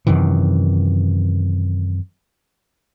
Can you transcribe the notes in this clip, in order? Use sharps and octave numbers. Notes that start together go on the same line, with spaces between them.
F#2 C3 D#3 E3